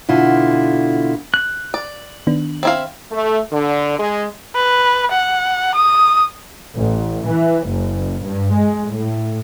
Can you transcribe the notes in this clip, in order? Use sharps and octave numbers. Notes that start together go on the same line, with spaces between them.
B2 D3 E4 F4
F#6
D5
D#3 B3 D4
C4 E4 F5
A3
D3
G#3
B4
F#5
D#6
A1
E3
F#1
G2
G#3
A2